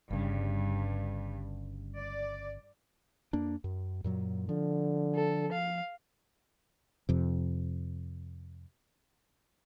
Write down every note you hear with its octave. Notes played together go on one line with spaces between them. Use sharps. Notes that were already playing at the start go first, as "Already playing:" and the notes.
G1 G2 C#3
D5
F2 A#3 D4
F#2
F#2 A#2 F#3
D3 F3
A4
F5
F2 C3